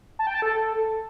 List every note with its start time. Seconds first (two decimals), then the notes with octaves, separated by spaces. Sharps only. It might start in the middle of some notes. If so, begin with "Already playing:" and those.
0.19 A5
0.27 G5
0.35 A5
0.42 A4